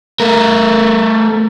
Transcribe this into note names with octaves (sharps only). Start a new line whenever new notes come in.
A3 A#4